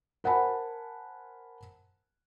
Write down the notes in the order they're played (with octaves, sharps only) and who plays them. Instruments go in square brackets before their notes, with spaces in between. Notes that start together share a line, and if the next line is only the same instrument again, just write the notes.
[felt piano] A#4 C5 F#5 G#5 A5 B5